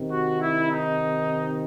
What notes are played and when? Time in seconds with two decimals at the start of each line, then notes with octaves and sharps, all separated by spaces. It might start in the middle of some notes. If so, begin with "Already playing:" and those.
Already playing: C3 D#3
0.11 F#4
0.42 E4
0.72 D#4